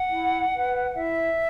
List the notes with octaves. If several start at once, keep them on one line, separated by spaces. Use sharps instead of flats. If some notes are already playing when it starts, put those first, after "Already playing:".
Already playing: F#5
E4
B4
E4 E5